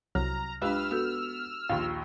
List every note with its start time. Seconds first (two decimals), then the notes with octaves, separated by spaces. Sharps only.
0.15 C2 F#3 A#5 F6
0.61 G#3 D4 F4 G4 B4 E6 F6
0.91 B3 F#4 A4
1.69 A#1 D#2 F4